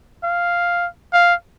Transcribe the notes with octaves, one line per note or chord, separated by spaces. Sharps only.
F5
F5